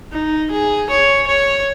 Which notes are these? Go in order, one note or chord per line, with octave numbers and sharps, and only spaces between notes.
D#4
G#4
C#5
C#5